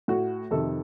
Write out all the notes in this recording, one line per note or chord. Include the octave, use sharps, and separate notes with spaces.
A2 F#4
F2 C3 D#3 A4